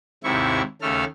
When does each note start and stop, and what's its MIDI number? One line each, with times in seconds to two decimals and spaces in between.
0.24 0.62 39
0.24 0.62 44
0.24 0.62 48
0.24 0.62 64
0.24 0.62 85
0.82 1.04 39
0.82 1.04 49
0.82 1.04 57
0.82 1.04 69
0.82 1.04 89